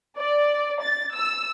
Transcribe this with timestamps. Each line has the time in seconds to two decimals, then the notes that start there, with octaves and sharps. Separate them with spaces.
0.18 D5
0.82 A6
1.14 E6